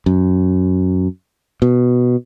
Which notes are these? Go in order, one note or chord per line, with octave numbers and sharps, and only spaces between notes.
F#2
B2